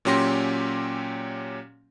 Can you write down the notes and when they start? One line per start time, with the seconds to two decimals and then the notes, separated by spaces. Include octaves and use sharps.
0.05 A#2 F#3 C#4 G4 C6 A#6